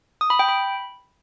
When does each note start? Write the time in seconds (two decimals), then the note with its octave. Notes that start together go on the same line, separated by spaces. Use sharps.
0.21 D#6
0.30 B5
0.39 G5
0.49 B5